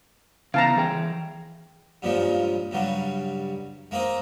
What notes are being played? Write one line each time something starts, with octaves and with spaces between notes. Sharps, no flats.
C#3 E3 B3 F5 A5 A#5
E3 G#4 G5
G2 A#2 C#3 F3 G#3
G2 C#3 F#3 G3
G#3 A#3 C4 D#4